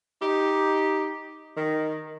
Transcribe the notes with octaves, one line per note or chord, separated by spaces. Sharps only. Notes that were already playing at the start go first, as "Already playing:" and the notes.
D#4 G4
D#3